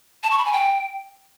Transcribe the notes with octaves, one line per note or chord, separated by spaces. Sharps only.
A5
C#6
B5
G#5
G5